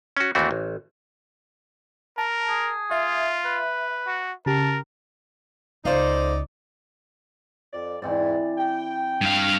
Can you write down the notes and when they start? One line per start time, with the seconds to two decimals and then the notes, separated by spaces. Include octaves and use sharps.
0.17 C#4 F#4
0.35 D#2 E3 A3 C4 F#4
0.51 A1
2.18 A#4 A5
2.49 G#4
2.91 F4 E5
3.45 B4
4.07 F#4
4.46 C#3 G4 A#4 A5
5.85 C#2 D#4 A4 C5 D5 F5
7.73 F2 D5
8.02 E2 G#2 E3 C4 D5
8.58 G5
9.21 G2 F5